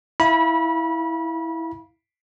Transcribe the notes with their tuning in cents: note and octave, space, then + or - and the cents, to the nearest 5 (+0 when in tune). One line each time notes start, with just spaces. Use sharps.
E4 -10 F5 -5 B5 -30